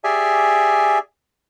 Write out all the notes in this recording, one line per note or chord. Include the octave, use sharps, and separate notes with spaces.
G4 G#4 D5 E5 G#5